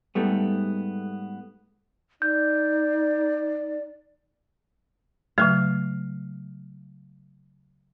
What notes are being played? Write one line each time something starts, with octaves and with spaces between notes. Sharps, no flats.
G#2 G3 A3 B3
D#4 D5 G6
C#3 F#3 A3 F5